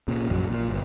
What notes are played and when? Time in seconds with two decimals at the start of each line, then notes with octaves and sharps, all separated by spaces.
0.08 A#2 C#3
0.29 A#1 F#2 F3 F#3
0.50 A#2
0.68 G1